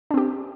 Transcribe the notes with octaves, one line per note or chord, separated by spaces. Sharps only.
C4 D4 G4